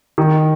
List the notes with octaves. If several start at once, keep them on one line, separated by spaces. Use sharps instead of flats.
D#3